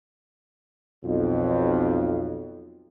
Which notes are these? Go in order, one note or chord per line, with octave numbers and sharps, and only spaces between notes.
B1 F2